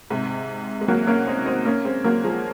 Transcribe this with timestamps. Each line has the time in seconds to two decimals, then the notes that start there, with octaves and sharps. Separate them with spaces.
0.10 G#2 C3
0.81 G#3
0.88 F#3 A#3
1.07 A#3 C#4
1.27 C4 D#4
1.46 C4 D#4
1.65 A#3 C#4
1.85 G#3 C4
2.04 F#3 A#3
2.24 F3 G#3